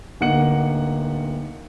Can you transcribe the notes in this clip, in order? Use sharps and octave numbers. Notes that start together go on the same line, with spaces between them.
D1 A#3 D#4 F#5 C#7 F#7